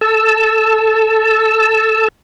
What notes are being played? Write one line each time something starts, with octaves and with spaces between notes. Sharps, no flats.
A4 A5 E6